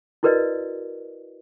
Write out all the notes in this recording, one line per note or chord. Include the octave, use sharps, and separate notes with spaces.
E4 F#4 A#4 B4 D5 D#5